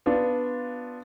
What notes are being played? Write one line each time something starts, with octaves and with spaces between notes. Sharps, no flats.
B3 D4 F4